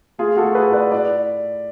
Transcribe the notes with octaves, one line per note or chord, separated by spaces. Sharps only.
A3 F4 G#4
F#4 A4
A3
G#4 B4
A2
B4 D5
A2 D5